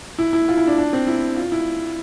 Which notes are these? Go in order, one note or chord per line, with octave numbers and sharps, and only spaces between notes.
E4
E4
F4
E4
D4
D4
C4
E4
F4
E4